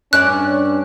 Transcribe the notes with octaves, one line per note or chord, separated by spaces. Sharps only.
G2 C#4 D4 D5 F#6